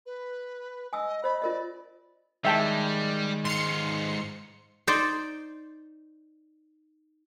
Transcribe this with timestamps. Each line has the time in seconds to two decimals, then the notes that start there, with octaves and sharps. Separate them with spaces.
0.06 B4
0.93 D#5 G#5 D#6 E6
1.24 C5 D#5 B5
1.42 F4 A#4 D5 D#5
2.45 D#3 G3 G#3 E5 G5 A5
3.45 G#2 F5 C6 C#7
4.87 D#4 C5 D5